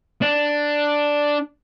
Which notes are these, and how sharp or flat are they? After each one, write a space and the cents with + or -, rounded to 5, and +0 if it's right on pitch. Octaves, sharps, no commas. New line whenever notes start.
D4 +0